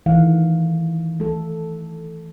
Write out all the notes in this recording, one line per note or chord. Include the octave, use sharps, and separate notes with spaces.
D#3 E3 A3 F5 F#5
A3 A4